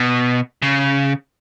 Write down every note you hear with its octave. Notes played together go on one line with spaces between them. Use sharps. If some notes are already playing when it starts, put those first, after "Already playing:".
Already playing: B2
C#3